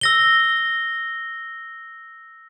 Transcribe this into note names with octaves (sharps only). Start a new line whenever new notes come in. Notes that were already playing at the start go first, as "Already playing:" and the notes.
E6 A#6 G7